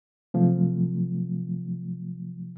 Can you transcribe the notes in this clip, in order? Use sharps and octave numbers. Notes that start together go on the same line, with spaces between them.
C3 F3 F#3 A3